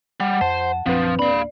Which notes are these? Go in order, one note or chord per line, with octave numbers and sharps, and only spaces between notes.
G3 F#5
F2 C5 A5
A#1 F#2 F3 C4 D4 B4
D1 A#3 D4 D5 F5 B5